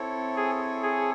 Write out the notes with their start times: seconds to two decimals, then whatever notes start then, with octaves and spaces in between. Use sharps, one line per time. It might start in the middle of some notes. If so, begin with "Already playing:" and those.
Already playing: C4 E4 A4 C#5
0.36 G#4
0.82 G#4